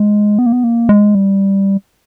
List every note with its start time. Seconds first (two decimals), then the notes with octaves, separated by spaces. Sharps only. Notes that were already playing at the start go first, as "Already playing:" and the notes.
Already playing: G#3
0.39 B3
0.46 A#3
0.52 B3
0.64 A#3
0.89 G#3
1.15 G3